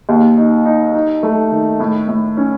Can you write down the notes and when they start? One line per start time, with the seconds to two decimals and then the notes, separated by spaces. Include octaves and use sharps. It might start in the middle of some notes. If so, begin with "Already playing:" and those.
0.09 D#2
0.37 D#4
0.65 D#4
0.94 D#4
1.23 A3
1.51 D#3
1.80 A2
2.08 A2
2.37 C#4